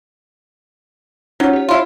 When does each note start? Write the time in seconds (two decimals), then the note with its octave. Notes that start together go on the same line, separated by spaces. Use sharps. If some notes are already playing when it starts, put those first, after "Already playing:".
1.40 F#3 C#4 D#4 F4
1.53 G4 C#5
1.69 E4 F4